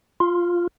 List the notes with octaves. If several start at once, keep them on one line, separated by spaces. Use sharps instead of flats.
F4